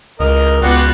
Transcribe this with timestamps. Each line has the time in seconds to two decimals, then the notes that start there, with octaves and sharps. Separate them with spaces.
0.20 C#2 A#4 D#5
0.62 C#2 B3 F4 F#4 D5 G5 C#6